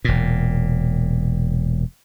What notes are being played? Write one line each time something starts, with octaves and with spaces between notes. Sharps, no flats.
E1 A#2